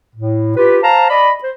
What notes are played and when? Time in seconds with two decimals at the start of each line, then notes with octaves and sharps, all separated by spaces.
0.14 A2
0.56 F4 G4 B4
0.82 C5 F5 A5 A#5
1.09 D5 D#5 B5
1.43 C5